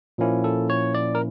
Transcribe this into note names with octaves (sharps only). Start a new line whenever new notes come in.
A#2 F3 A#3 C#4 E4
A4
C#5
D5
A#4